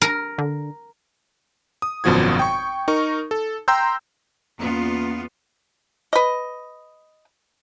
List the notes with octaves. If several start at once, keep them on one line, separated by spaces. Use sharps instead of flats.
A#4
D3
D#6
G#1 F#2 B2 F3 F#4 G#6
G5 C#6
D#4 A#4 C#6
A4
G5 A#5 C6 E6 G6
E2 A#3 B3 C#4 F4
B4 D#5